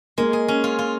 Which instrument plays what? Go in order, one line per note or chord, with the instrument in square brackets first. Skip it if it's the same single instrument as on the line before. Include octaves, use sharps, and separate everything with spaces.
[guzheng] G#3 [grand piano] A#3
[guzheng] G#4
C#4
F4
F4